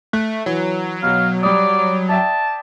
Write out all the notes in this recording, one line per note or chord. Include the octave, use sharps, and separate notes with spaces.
A3 F#6
E3 F#3
B2 F#4 F5
G3 D5 D#6
D5 E5 G5 A5